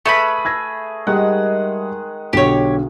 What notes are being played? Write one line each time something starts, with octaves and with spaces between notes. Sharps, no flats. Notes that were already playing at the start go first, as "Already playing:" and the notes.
A3 G#4 B4 E5 B5
E6 G#6 A#6
D#3 G3 G#3 G#4 F#5
B1 D3 G4 C#5